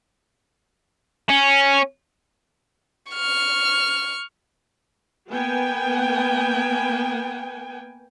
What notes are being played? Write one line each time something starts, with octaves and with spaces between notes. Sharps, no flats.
C#4
C#6 F6
A#3 B3 G5 G#5